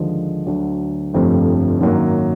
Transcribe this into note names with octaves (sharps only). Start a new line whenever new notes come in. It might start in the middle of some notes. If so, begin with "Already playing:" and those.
Already playing: D#2 D3 F3 G#3
D2 D3 F#3
G1 F2 C3 F3 A3
G#1 F#2 D#3 F#3 A#3